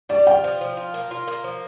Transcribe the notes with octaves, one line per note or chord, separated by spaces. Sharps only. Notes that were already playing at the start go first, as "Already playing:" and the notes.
G3 D5
F4 G5
F3
F3
F4
A#3
F4
A#3
F3